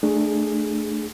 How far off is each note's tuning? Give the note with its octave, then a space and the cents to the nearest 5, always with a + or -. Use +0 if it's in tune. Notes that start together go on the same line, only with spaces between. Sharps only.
A3 +0 D4 +25 G#4 +0